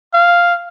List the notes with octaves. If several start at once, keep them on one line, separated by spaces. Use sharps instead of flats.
F5